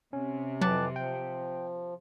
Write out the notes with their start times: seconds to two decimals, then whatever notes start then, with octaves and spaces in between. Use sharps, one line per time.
0.13 C3 C#4
0.61 F2 E3 F#3 G4 A5 F#6 A6
0.96 F3 G5